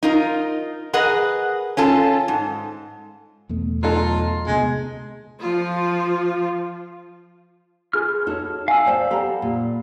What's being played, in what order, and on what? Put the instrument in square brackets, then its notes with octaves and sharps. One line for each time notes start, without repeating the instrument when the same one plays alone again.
[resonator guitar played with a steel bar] D#4 F4 A#4
G#4 A#4 B4 D#5 F#5
C#4 F4 A4
G#2
[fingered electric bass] E2 B2 A3
[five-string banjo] F#3 D#4 A4 [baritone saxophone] F4
[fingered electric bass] D2 C3 B3 [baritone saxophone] G#3
[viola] F3 F4
[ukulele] F4 G#4 B4 [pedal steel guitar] F6
[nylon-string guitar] D#4 F#4 A4 [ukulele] E4 C#5
[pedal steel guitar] F5 E6 [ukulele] G#5 A5
[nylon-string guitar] C5 D5 G5
[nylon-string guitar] G4 A4 [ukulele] F#5 A#5 B5
[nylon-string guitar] A#2